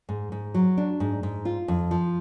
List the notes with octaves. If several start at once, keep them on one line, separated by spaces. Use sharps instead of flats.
G#2
G#2
F#3
D4
G#2
G#2
F4
F2
F3